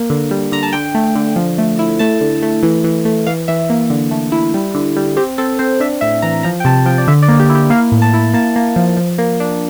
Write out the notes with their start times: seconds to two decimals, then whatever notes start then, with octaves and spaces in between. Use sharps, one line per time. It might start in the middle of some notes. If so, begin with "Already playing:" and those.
Already playing: A#3
0.10 D3
0.31 G3
0.52 D3 A#5
0.63 A5
0.73 D3 G5
0.95 A3
1.15 D3
1.36 F3
1.58 A3
1.79 E4
1.99 A3 A5
2.21 D3
2.42 A3
2.63 E3
2.84 E3
3.05 A3
3.27 E3 F5
3.48 E3 E5
3.70 A#3
3.90 D3
4.11 A3
4.32 E4
4.54 G3
4.74 D3
4.96 G3
5.17 C4 G4
5.38 C4 A4
5.59 C4 C5
5.80 D4 E5
6.01 A2 E5
6.22 E3 A#5
6.43 F3 A#5
6.60 G5
6.65 C3 A5
6.86 F3 G5
6.98 D5
7.08 D3 E5
7.22 D5
7.28 A#3
7.40 G4
7.50 E4
7.55 G4
7.70 A#3 F5
7.92 A2
8.02 A5
8.14 E4
8.34 A#3 A5
8.56 A#3
8.76 F3
8.97 F3
9.18 A#3
9.40 D4